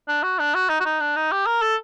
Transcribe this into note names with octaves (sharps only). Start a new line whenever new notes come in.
D4
F#4
D4
F#4
D#4
F#4
D#4
D4
D#4
G4
A#4
A4